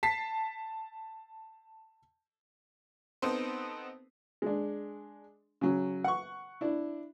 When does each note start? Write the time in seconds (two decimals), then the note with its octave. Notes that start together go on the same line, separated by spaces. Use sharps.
0.03 A5 B6 C7
3.22 B3 C4 D#4 A4 B4 C5
4.42 G#3 D4
5.61 C#3 F#3
6.04 F#5 C#6
6.61 D4 E4